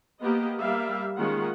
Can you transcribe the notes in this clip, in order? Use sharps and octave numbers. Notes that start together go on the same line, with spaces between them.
A#3 B3 G4 D#5
G3 A#3 G4 E5 F5
D#3 G#3 A#3 C#4 F4 F#5